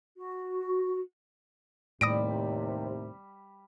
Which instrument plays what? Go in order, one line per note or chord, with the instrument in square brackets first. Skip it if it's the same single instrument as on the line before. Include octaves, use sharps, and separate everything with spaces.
[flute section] F#4
[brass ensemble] D#2 C3 [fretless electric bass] A2 [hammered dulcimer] G3 [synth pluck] D#6 A#6 D7